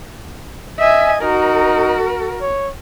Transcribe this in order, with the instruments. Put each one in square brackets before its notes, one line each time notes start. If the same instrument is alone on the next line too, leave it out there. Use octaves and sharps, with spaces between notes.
[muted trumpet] D#5 [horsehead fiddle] E5 G#5
[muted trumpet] D#4 [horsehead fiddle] F#4 A#4
[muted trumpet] C#5